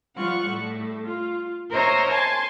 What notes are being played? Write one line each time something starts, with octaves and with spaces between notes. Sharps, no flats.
F3 G3 F4 F#5 C#6
A2 G3 A3
F4
A#4 C5 C#5 D#5 E5 A#5
G#5 A5 C6